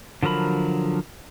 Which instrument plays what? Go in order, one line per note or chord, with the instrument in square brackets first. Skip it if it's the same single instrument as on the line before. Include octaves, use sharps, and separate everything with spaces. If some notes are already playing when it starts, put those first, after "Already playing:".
[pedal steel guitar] D3 F3 F#3 A#4 B5